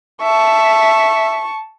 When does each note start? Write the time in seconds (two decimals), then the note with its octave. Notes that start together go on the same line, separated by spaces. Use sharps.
0.23 E5 A5 C#6